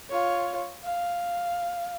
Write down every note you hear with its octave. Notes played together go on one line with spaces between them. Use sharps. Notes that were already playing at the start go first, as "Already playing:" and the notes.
F4 C#5
F5